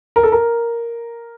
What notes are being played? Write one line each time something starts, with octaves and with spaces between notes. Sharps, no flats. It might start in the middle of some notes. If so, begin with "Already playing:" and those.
A#4
A4
A#4